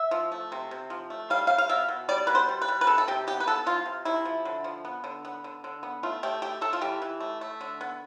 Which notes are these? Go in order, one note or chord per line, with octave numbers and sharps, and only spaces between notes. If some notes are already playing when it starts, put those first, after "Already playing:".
Already playing: E5
F3
A3
C3
C3
F3
A3
G3 F5
G3 F5
F5
B2 E5
B2
G3 D5
B2 B4
C5
G3
B4
G3
B4
C3 A4
A4
C3 G4
B3 G4
B4
B3 A4
F3 F4
C3
C3 E4
F3
D3
F3
B3
D3
B3
D3
D3
B3
A3 F4
A3 G4
A3 G4
A3 A4
F4
E3 G4
E3
A3
A3
D3
B3